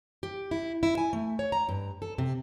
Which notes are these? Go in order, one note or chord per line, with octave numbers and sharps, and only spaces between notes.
G4
E4
E4
G#5
A3
C#5
A#5
G2
A4
C3